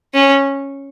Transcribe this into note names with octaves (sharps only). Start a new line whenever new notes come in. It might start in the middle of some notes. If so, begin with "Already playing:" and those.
C#4